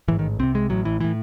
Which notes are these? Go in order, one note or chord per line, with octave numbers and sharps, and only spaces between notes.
A1 G#2 E3
D#3
C2 C3 C4
G#3
A1 A2 F#3
E3
A2 E3